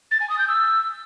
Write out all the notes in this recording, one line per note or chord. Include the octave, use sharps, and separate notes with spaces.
A6
G#5
D#6
G6
E6